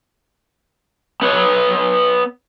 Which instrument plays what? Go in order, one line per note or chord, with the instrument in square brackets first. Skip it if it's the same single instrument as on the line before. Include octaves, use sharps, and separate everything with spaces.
[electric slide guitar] B3 B4 C#5